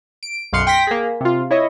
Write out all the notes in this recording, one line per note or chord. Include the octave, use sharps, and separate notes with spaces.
D7
B1 F#2 F5 C6 F#6 C#7
G5 C6 A#6 B6
A#3 G#4
C3 F4
E4 C#5 D#5